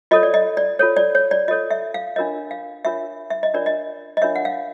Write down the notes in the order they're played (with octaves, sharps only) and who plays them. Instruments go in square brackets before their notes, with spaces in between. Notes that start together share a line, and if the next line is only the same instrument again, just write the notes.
[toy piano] F4 A4 C#5 D#5
D5
D#5
D5
F4 A4 C#5
D5
C#5
D5
F4 D#5
A4 C#5
E5
F5
D4 F4 A#4 C#5 D#5
F5
D4 F4 A#4 C#5 E5
E5
D#5
D4 F4 A#4 C#5 D5
D#5
D#5
D4 F4 A#4 C#5 E5
F#5
F5